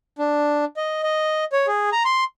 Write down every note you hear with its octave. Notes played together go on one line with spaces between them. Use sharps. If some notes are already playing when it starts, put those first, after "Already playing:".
D4
D#5
D#5
C#5
G#4
A#5
C6